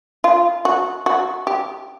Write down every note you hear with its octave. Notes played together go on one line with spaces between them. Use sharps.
F4
F#4
F#4
G4